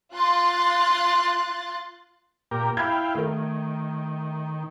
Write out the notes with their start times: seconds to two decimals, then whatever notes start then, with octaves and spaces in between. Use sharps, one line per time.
0.14 F4 C6 F#6 A6
2.51 A#2 G4 A#4
2.77 E4 F5 G5 B5 G#6
3.15 D#3 A3 A#4